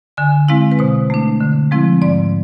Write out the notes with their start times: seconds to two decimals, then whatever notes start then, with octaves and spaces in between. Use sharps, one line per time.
0.17 D3 G#5
0.48 G#3 C4 E4 F5
0.71 B4
0.79 B2 C5
1.10 A3 D4
1.41 D3
1.71 F3 G#3 C4 E4
2.02 G#2 D5